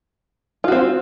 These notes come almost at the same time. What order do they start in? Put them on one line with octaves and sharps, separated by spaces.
F4 F#4 C4